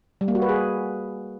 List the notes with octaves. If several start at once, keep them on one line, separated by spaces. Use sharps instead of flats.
G3
A#3
F#4
B4
G#4